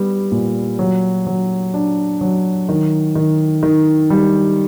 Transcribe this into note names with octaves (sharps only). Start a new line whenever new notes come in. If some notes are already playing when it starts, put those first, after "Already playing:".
Already playing: G3 B3
A#2
F#3
F#3
D4
F#3
D#3
D#3
D#3
G3